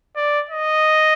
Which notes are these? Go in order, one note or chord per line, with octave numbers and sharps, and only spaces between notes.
D5
D#5